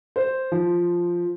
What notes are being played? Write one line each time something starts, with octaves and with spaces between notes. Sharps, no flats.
C5
F3